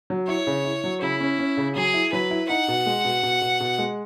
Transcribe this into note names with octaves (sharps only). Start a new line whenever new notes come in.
F#3
E4 C#5
C#3
E4
F#3
C#3 E4
C#4
C#4
C#3
F#3 G#4
E4
F#3 B4
E4
D#4 F#5
B2
G#3
B2
B2
B2
B2
G#3